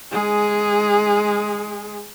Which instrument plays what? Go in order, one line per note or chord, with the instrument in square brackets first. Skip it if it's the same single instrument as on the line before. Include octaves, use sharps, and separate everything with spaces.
[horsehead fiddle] G#3 G#4